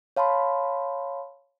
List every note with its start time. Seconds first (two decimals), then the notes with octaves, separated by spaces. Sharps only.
0.17 C#5 F5 A5 B5 C6